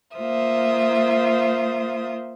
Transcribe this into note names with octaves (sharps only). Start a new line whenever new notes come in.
A#3 F4 C5 E5 D#6